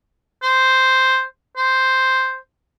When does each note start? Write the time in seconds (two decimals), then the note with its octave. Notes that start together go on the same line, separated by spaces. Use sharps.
0.43 C5
1.56 C5